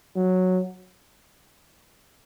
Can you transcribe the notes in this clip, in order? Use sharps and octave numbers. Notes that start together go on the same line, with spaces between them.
F#3